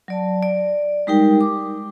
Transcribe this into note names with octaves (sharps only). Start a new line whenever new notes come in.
F#3 D5 A5
D5
G3 G#3 D#4 G4 A#4 G5
D6